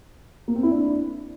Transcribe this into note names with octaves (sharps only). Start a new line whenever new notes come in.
A#3
C4
E4
D4